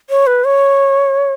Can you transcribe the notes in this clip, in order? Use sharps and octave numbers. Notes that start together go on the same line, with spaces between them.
C#5
B4
C#5